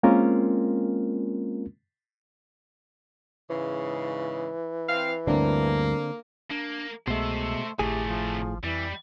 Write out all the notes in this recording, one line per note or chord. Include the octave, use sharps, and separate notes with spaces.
G#3 A#3 C4 C#4 F4 A#4
G#2 C#3 E3
C4 F5
D2 G2 D3 A#3 C4 D4
A#3 D4
C2 B2 G#3 A3 C5 E5
G#1 A2 C3 A3 G4 G#4
F3
F2 E3 G3